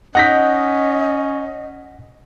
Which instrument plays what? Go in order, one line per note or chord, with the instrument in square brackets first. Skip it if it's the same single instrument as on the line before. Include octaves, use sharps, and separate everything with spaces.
[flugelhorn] C#4 [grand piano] D#4 A#6 B6 [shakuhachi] D#5 [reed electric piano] F#5 G6